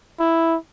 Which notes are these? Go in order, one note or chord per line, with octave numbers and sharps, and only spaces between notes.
E4